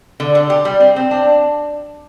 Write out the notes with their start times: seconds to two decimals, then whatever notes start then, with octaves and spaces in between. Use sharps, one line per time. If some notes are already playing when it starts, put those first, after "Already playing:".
0.20 D3
0.35 D3
0.50 G4
0.65 G3
0.80 C4
0.96 C4
1.11 D4